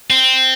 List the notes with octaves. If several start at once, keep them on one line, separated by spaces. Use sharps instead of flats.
C4